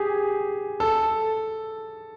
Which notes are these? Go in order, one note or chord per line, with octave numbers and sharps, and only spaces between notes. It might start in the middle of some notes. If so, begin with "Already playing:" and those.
Already playing: G4 G#4
A4